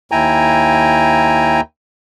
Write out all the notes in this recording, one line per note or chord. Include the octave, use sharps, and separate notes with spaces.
D#2 E4 G5 G#5 A#5